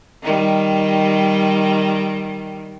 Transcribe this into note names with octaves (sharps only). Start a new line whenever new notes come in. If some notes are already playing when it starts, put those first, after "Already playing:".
D#3 G3